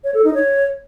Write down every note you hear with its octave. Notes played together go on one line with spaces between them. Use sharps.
C#5
A4
D#4
C#5